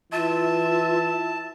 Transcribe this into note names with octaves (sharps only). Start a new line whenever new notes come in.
E3 F4 E5 A5